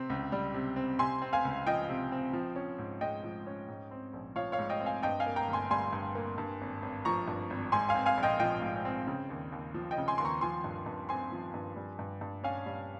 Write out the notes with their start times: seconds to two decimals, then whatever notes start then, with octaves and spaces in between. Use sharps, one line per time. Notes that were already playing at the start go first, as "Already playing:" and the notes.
Already playing: C3 C4
0.10 C#2
0.32 G3
0.54 C3
0.76 C4
0.99 C3 G#5 C6
1.22 C4
1.33 F5 G#5
1.45 C#2
1.66 F3 D#5 G5
1.89 C3
2.12 C4
2.33 F3
2.56 C#4
2.78 G#2
3.01 G#3 D#5 G5
3.24 F3
3.47 C#4
3.68 G#2
3.91 C4
4.13 A#1
4.36 F3 C#5 F5
4.52 C#5 F5
4.59 G#2
4.69 D#5 G5
4.80 C4
4.86 F5 G#5
5.03 G2 D#5 G5
5.20 F5 G#5
5.26 A#3
5.36 G5 A#5
5.48 G1
5.53 G#5 C6
5.71 G3 G#5 C6
5.93 G2
6.15 A#3
6.38 G2
6.61 G#1
6.82 G#1
7.05 F3 A#5 C#6
7.28 G2
7.50 G#1
7.72 G#2 G#5 C6
7.89 F5 G#5
7.95 C4
8.06 F5 G#5
8.17 A#1
8.23 D#5 G5
8.40 F3 D#5 G5
8.62 G#2
8.85 C4
9.07 C#3
9.30 D#2
9.52 D#2
9.74 F3
9.91 D#5 G5
9.98 C#3
10.08 G#5 C6
10.18 D#2 C6
10.25 A#5 C#6
10.41 F3 G#5 C6
10.64 G2
10.86 G2
11.09 C4 G#5 C6
11.32 F3
11.54 G2
11.76 G3
11.99 G2
12.21 G2
12.44 C#4 F5 G#5
12.66 G3